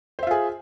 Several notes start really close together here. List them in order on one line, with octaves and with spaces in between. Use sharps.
C5 E5 F4 G#4